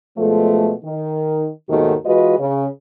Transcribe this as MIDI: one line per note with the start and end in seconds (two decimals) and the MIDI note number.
0.17 0.72 47
0.17 0.72 53
0.17 0.72 56
0.17 0.72 57
0.84 1.49 51
1.69 1.94 39
1.69 1.94 44
1.69 1.94 47
1.69 1.94 51
1.69 1.94 57
1.69 1.94 66
2.05 2.38 52
2.05 2.38 56
2.05 2.38 65
2.05 2.38 66
2.05 2.38 71
2.05 2.38 75
2.38 2.66 49